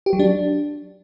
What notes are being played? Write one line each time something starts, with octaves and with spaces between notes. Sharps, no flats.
G4
F#3
D4